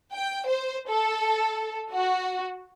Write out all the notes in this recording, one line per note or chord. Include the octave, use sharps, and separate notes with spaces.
G5
C5
A4
F#4